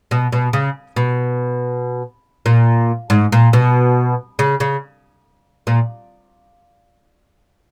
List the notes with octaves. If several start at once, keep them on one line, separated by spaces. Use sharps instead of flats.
B2
B2
C#3
B2
A#2
G#2
A#2
B2
C#3
C#3
A#2